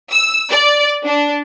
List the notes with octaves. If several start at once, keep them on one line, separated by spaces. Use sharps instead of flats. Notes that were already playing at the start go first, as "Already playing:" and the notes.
E6
D5
D4